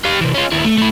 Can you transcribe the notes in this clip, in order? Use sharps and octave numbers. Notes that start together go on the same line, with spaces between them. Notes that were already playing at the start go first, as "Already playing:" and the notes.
G4 F5
C3 E3
C#4 F4
D#2 E4
A3
A3 E4